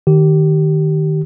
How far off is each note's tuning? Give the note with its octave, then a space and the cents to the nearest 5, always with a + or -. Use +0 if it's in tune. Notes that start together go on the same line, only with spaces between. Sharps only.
D#3 -10 G4 -20